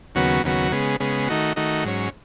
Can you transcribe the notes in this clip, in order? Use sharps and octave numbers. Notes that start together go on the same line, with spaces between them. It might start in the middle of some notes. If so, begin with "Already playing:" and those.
D#2 C#3 F#3 B3 F#4
D#2 C#3 F#3 B3 F#4
C#3 G#3 B3
C#3 G#3 B3
D#3 A3 D#4 F#4
D#3 A3 D#4 F#4
G#2 F#3 C#4